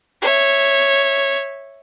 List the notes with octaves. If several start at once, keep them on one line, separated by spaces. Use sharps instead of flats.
C#5 E5